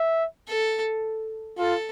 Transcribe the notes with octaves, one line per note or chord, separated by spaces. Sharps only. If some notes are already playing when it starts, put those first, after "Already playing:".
Already playing: E5
A4
F4 A4